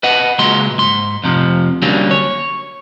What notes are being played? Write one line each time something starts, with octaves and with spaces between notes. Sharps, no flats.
B4 D#5 F#5
C#2 A#2 F#3 G#3 C6
G#2 C6
F2 C3 F3
D3 F#3 G3 A#3 C#4
C#5